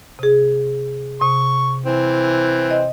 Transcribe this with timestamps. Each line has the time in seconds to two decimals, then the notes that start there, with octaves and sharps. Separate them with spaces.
0.19 C3 G#4
1.22 C3 C#6
1.86 E3 C4
2.71 D#5